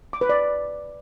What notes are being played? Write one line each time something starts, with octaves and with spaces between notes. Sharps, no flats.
D6
B4
D5